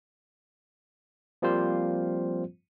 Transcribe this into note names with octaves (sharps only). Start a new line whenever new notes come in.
F3 G3 A#3 C4 F4 C5